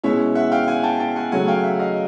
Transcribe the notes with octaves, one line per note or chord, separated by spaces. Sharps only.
B2 G#3 C#4 E4 E5
E5 F#5
F5 G5
F#5 G#5
G5 A5
G5 A5
F#5 G#5
C#3 F#3 A3 F#5 G#5
F5 G5
E5 F#5
D#5 F5